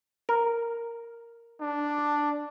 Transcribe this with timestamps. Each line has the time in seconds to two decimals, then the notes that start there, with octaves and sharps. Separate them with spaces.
0.29 A#4
1.61 D4